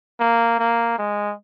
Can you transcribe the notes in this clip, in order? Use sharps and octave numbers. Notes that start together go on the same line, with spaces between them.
A#3
A#3
G#3